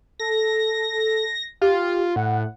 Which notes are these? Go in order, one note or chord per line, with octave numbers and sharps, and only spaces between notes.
A4 A#6
F4 G4
A2 F#5